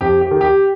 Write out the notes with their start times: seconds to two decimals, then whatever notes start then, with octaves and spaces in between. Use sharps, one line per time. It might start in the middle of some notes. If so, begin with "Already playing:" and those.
0.01 F2 G4
0.21 G4
0.31 D#3
0.41 G4